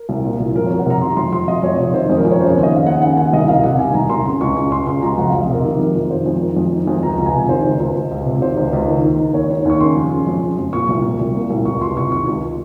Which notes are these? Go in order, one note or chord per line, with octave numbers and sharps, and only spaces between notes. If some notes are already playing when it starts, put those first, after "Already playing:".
Already playing: A#4
C2
A#2
C2
F2 A#4
C#5
F2
F#5
C3 A#5
D#3 C6
F2 C6
F2 C6
F2 D#5
F2 C#5
C3 D#5
D#3 C5
F2
A#4
F2
C#5
C#3 C5
C#5
D#2
D#5
C#3 F5
D#2 F#5
C#3 F#5
D#2 F#5
C2 D#5
C2 F5
C3 F#5
D#3 G#5
C2 A#5
C2 C6
C#3 C6
C#2 C#6
C#3 C#6
C#2 C6
C#3 C6
C#2 A#5
F2 F#5
F5
F2
D#5
C3 A#4
D#3
F2
F2
D#3 C5
F2
D#3
F2
D#3
F2
C#2 A#5
C#2
G#5
C3
D#3 C5
C#2
C#2
C#2
C#2
C3
D#3 C5
C#2
C#2
D#3
D#2
D#3
D#2 C#5
D#3
C#5
D#2 C#6
C#3 C6
F2
C#3
F2
C#3
F2
A#2 C#6
C2
A#2
C2
A#2
C2
C#2 C#6
C#2 C6
C3 C#6
D#3 C#6
C#2